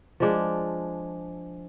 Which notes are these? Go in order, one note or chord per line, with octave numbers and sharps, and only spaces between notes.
F3 G#3 D4